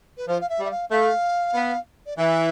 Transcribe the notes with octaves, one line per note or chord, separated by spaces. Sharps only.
B4
F3 C5
F5
E5
G3
E5
F5
A3 F5
B3
D5
E3 E5